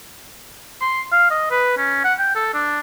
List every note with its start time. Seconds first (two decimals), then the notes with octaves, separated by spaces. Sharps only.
0.81 C6
1.12 F5
1.31 D#5
1.51 B4
1.78 C#4
2.04 F#5
2.19 G5
2.36 A4
2.54 D4